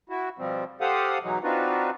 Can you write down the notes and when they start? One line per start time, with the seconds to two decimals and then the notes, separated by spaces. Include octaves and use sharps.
0.09 E4 F#4
0.39 B2 F3 G3 C4
0.81 G4 A4 C5 F5 F#5 D#6
1.23 B2 E3 F#3 G#3 D#4
1.43 C4 D4 D#4 F4 F#4 B4